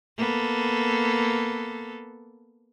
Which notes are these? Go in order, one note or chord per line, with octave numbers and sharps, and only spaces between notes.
A#3 B3 A4